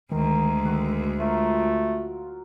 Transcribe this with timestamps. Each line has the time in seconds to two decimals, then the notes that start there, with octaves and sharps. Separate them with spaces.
0.12 D2 D#3 G#3 A#5
0.65 D#3 F#4 A4 D#5
1.20 F#3 A3 F4 A#4